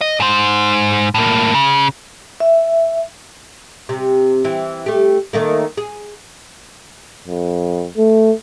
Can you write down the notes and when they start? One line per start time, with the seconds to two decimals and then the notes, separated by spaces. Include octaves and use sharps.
0.01 D#5
0.20 G#2 C5
1.15 A2 A#3
1.54 C#3
2.40 E5
3.89 C3
4.44 E3 C4
4.86 A3 G4
5.33 D#3 A3 A#3
5.77 G#4
7.27 F2
7.97 A3